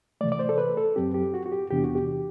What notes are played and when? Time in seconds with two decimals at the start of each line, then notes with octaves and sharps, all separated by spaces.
0.21 C3 E3 A3 D5
0.32 D5
0.39 C5
0.49 A4
0.58 B4
0.77 A4
0.96 F#2 F#3 C4 G4
1.14 G4
1.34 F#4
1.46 F#4
1.52 G4
1.70 E2 C3 E3 B3 D4 G4
1.84 F#4
1.95 G4